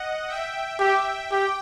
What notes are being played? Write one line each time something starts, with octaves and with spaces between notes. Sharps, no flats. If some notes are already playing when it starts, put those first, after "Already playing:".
Already playing: D#5 F#5
E5 G5
G4 E5 G5
G4 G5